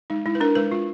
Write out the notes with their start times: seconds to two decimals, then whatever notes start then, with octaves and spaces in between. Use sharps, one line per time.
0.10 G#3 D#4
0.26 G#3 E4
0.35 B4
0.41 D4 A#4
0.55 G#3 B4
0.71 G#3 F4